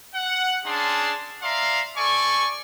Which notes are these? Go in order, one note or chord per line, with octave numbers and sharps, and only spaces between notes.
F#5
C#4 D4 G#4 A5 C6
D5 E5 F5 A#5 C6
A4 D5 G#5 C#6